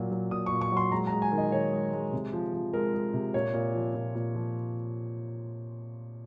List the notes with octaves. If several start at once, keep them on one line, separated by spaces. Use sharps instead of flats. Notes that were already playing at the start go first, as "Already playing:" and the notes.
Already playing: A#2 F#3
F#3
A#2 D#6
C#6
A#2
C#6
F#3 C6
G#3 A#5
A#5
G#3
G#5
D#3
D#5
D#3 C#5
G#3
G#3
C3
F3
F3
G#3 A#4
G#3
C3
A#2 C#5
A#2
F3
A#2
A#2
F3